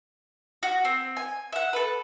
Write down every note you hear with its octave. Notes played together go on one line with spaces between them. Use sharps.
F#4
C4
G#5
E5 F#5
A4 B4